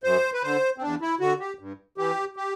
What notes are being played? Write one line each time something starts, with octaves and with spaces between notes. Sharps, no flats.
F#2 C5
B4
D3 C5
C4
E2 D4
E4
D3 F#4
G4
G2
E3 G4
G4